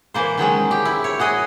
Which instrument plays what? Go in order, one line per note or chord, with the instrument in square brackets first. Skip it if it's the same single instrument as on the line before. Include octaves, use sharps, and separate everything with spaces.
[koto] E3 A#3 C5
D#3 F#3 G#3 C#4
G4
E4
C#5
F#4 G#4 D#5